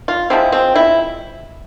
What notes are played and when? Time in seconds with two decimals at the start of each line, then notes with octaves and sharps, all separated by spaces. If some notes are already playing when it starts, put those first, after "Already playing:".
0.08 F4
0.30 F3 G#3 C4 E4
0.52 C4
0.75 E4